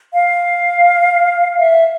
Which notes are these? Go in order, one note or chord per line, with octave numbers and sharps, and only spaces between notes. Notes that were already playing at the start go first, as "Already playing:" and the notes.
F5
E5